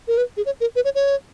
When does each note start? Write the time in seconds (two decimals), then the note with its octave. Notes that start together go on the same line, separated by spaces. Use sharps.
0.08 A#4
0.17 B4
0.37 G#4
0.46 C#5
0.60 A#4
0.76 B4
0.84 C#5
0.95 C#5